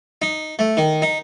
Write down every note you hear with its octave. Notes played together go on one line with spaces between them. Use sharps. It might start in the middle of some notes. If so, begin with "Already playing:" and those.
D#4
A3
D#3
D#4